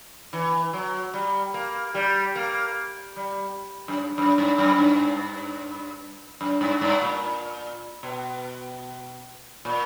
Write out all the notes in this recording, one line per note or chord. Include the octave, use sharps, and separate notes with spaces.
E3
F#3
G3
A#3
G3
A#3
G3
F#2
G2
F#2
G2
F#2
G2
F#2
G2
G2
A#2
B2
A#2